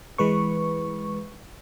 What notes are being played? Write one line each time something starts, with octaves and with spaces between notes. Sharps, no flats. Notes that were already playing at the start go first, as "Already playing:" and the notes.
E3 G#3 B4 C#6